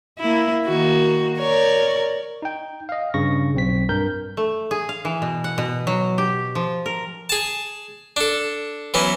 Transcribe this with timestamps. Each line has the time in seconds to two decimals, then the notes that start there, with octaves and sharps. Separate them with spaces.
0.19 A#3 E4
0.67 D#3 A#3 F#4
1.39 A#4 C#5 D5
2.42 D#4 G5
2.89 D#5 F5
3.14 G2 C#3 C#6 A#6
3.54 B1 C4 B6
3.89 G2 A#4 G6
4.37 A3
4.71 G#4
4.89 F5
5.05 E3
5.22 B2
5.44 F#5
5.58 B2
5.87 F#3
6.18 G4
6.55 F3
6.86 A#4
7.29 G#4 A5
8.16 D4 A4
8.94 E3 F#3 B3 C#4